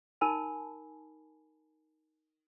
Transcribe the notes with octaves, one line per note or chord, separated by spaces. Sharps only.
D#4 A#4 G#5 A5 B5